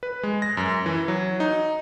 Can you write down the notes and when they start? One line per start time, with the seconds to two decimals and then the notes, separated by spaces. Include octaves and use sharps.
0.03 B4
0.23 G#3
0.42 A#6
0.57 F#2
0.86 E3
1.08 F#3
1.40 D#4